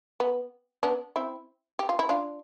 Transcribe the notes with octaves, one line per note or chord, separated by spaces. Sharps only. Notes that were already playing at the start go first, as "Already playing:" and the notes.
B3
B3 D4
C4 E4
G4
F4
E4
D4 F4